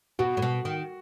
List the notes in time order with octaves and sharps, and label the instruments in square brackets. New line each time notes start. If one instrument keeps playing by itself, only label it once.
[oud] B2 [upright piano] F#4
[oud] A2
B2
D#3